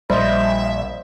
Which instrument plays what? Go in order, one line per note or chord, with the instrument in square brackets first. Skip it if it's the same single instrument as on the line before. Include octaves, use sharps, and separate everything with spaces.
[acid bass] A#1 [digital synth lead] G3 [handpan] C5 D#5 [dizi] E5